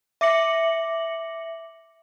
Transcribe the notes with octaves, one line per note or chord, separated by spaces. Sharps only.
E5 D6 A#6 C#7 F#7